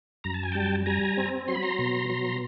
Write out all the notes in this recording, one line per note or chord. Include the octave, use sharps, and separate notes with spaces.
F#2 A#5
A5
G#5
G3 G5 A5
G3 G#5 A#5
C4
F#3 C6
B5
A#5 C6
B2
F#3